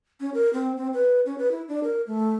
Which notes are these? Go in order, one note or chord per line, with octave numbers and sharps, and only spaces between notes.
C#4
A#4
C4
C4
B4
C#4
B4
E4
D4
A#4
A3